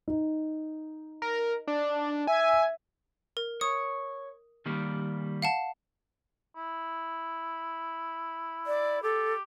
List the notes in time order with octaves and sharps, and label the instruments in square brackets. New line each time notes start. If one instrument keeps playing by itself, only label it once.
[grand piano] D#4
[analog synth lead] A#4
D4
[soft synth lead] E5 [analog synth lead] G#5
[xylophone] A#4
[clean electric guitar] C#5 [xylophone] D#6
[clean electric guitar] D#3 G3 A#3
[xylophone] F5 F#5 A5
[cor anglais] E4
[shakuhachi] D5
[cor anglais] G4 [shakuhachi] A4